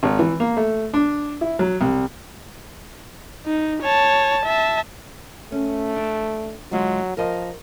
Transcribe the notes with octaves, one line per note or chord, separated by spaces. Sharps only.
G#1
E3
A#3
A3
D4
E4
F#3
C2
D#4
C#5 A5
E5 A5
A3 C#4
D4
D3 F#3 G#3 F4
F3 A#4 D#5